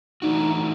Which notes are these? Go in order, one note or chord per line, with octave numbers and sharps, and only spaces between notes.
E3 A3 D4 D#4 F#4